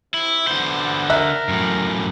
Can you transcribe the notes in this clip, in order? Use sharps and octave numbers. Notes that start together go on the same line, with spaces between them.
C3 E4
D3 B3 C5
A#4 E5 F#6
F#2 A2